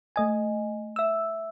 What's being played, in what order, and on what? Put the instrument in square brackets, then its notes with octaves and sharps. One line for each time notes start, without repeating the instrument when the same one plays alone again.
[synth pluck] A3 D#5 G#5
E5 E6